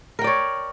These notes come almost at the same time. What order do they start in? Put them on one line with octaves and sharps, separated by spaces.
A#4 G5 D5 C#5